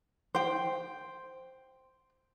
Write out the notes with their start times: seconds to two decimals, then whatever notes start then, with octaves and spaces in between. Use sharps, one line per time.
0.35 C5 G5